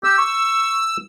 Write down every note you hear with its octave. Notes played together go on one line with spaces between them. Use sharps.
G4 E6
C#6